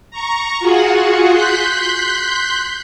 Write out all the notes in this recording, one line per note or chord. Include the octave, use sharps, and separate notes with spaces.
A#5 C#6
F4 F#4 G#4 F#5
C6 F#6 G6 B6